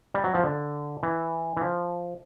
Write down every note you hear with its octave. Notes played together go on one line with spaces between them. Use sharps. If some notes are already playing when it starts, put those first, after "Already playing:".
G3
F#3
F3
D3
E3
E3
F3